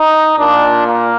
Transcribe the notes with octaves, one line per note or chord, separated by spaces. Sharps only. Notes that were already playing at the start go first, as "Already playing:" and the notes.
Already playing: D#4
A#2 D4
A#3